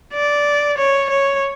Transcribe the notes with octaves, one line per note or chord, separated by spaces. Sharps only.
D5
C#5
C#5